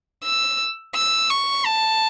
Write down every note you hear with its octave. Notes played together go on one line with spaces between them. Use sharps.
E6
E6
C#6
A5